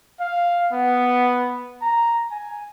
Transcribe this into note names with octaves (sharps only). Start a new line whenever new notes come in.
F5
B3
A#5
G#5